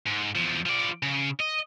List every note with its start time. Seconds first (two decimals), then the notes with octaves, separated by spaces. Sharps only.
0.07 G#2
0.35 E2 F3
0.66 F3 D5
1.03 C#3
1.40 D#5